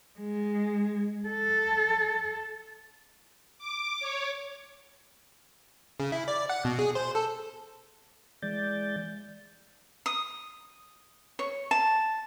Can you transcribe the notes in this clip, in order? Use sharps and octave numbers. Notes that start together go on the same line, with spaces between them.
G#3
A4
D6
C#5
C#3
E4
D5
F#5
B2
G#4
C5
A4
E3 G#3 D5 G6 A6
D#6
C#5
A5